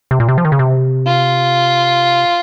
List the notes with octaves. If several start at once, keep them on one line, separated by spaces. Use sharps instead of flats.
C3
A#2
C3
F3
D#3
C#3
C3
F4